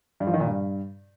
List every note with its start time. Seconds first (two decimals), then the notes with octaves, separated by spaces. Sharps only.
0.20 G2
0.27 F3
0.34 D#3
0.40 A#2
0.47 G2